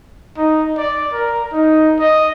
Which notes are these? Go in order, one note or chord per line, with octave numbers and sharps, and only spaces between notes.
D#4
D5
A#4
D#4
D#5